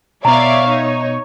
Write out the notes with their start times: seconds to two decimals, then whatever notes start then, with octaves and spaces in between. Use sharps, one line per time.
0.25 B2 B3 C#5 D5 E5 F5 A#5
0.68 D#4